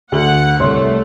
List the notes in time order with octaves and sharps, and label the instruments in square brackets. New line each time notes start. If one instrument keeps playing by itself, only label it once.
[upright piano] D2 F#7 [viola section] F#5
[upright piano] C2 C#5 C6 [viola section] A3